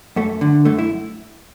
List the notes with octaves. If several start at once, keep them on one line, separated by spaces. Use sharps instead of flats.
F#2 A3
D3
F#2 A3
E4